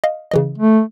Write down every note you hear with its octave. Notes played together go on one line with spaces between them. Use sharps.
D#5 F5
C#3 E3 D#5
A3